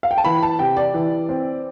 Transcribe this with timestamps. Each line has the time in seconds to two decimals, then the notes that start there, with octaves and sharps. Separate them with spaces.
0.03 F5
0.11 G5
0.18 A5
0.25 E3 B5
0.43 A5
0.59 C3 G5
0.77 D5
0.94 E3
1.29 C4